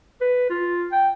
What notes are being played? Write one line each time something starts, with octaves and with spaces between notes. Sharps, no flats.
B4
F4
G5